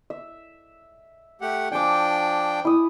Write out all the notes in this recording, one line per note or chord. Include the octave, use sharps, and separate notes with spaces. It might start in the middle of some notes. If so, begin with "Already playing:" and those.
E5
A3 G4 F#5
F3 D4 G5 G#5 D6
E4 D#6